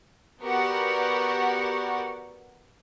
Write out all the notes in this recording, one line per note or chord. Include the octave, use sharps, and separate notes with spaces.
B3 F#4 G4 A#4 D5 F#5